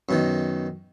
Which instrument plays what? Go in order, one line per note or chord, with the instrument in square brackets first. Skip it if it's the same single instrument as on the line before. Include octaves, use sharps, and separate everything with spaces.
[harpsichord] F#2 B2 D#3